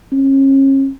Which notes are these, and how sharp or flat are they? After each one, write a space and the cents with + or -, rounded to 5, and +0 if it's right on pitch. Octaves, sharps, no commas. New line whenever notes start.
C#4 -35